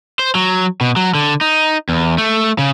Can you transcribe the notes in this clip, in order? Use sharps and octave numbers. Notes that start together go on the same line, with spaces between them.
C5
F#3
B2
F#3
D3
D#4
E2
A3
C#3